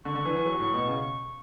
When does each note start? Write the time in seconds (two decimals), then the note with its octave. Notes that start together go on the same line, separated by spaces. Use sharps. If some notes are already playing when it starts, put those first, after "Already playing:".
0.04 D3 C#6
0.15 D3
0.25 E3
0.36 E3
0.46 F#3
0.60 A2
0.74 B2
0.87 C#3